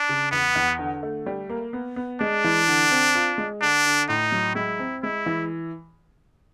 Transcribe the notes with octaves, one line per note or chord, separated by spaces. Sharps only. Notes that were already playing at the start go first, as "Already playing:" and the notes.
Already playing: D4
C#3
E2 B3
E2
D3
A3
G3
A#3
B3
B3
G#3 D4
E3
D3
C4
F4
G#3
D3 D4
D3
A2 D#4
F#3
G#3 E4
C4
G#3 E4
E3